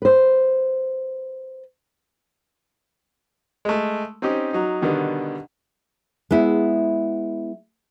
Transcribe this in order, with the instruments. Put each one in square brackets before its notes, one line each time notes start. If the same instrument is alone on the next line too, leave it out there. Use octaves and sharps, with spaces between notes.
[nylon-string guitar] B4 C5
[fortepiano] G#3 A3
C4 C#4 D#4 G4
F#3 D#4
B2 D3 D#3 G3 B3
[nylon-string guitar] G#3 B3 E4